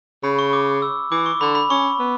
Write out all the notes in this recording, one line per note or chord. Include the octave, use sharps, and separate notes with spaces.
C#3 B5
C#6
D6
E6
E3 D6
C#6
D3 B5
B5
C#4 C#6
B3